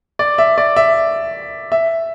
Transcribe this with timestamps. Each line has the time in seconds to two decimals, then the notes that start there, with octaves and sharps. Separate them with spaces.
0.19 D5
0.38 E5
0.58 D5
0.76 E5
1.72 E5